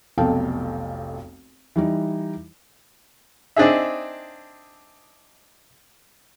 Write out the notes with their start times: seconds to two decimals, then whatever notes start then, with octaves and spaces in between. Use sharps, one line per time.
0.18 F1 B1 A4 F5 G5 A5
1.76 E3 G3 D#4
3.56 C4 D4 D#4 G#4 E5